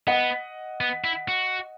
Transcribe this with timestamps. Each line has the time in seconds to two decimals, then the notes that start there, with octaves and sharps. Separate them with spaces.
0.07 B3 D#5 F#5
0.81 B3
1.04 E4
1.28 F#4